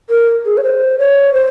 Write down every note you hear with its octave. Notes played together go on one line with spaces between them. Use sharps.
A#4
G#4
C#5
C5
C#5
C5